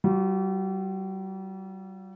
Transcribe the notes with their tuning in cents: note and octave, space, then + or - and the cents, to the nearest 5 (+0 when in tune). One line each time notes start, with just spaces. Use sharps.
G3 -40 F4 +35